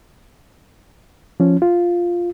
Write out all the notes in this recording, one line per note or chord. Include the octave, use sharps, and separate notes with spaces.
F3 C#4
F4